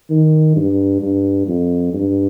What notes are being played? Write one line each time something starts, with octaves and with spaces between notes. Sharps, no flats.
D#3
G2
G2
F2
G2